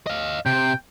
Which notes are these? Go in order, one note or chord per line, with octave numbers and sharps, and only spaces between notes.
D#5 F5
C3 G5